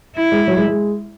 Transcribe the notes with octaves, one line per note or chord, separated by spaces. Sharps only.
E4
G#3
F#3
G#3
G#3